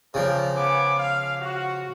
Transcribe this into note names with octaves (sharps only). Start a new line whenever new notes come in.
C#3 F3 A#4 D5 G5
B3 G#5 D6
F5
F#4